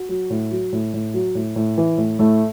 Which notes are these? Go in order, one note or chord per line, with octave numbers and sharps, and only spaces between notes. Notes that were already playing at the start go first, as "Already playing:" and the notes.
Already playing: F#4
F#3
A2
F#3
A2
A2
F#3
A2
A2
E3
A2
A2 A3